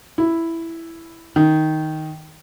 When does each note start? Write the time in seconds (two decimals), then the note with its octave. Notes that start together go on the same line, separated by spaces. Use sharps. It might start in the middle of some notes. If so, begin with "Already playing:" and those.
0.18 E4
1.36 D#3